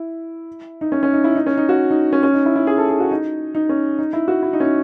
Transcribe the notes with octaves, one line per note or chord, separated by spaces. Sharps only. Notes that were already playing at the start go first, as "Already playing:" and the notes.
Already playing: E4
D#4
C#4
C#4
D#4
E4
D#4
C#4
D#4
F#4
D#4
C#4
C#4
D#4
E4
E4
G#4
A4
G#4
F#4
D#4
D#4
C#4
D#4
E4
F#4
E4
D#4
C#4
D#4